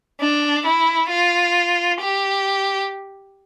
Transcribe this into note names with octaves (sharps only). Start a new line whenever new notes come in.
D4
E4
F4
G4